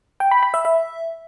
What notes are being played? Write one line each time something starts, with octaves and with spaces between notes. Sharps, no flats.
G5
B5
B5
E5
E5